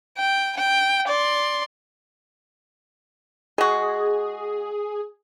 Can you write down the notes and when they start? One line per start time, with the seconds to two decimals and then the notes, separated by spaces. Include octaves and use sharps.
0.18 G5
0.57 G5
1.08 D5 C6
3.58 G#3 F#4 G#4